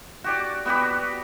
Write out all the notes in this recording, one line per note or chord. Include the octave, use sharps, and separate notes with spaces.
F#4 G4 D5
B3 F#4 G4 B5